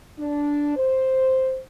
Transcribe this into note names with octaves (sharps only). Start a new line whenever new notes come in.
D4
C5